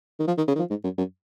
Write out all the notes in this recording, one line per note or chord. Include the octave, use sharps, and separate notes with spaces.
D#3
F3
D#3
C#3
D#3
F3
G#2
F#2
F#2